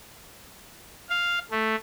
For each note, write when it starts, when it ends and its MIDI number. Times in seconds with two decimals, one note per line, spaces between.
1.09 1.39 77
1.51 1.75 57